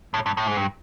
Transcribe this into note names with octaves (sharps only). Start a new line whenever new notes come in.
A2
G2
A2
G#2
G2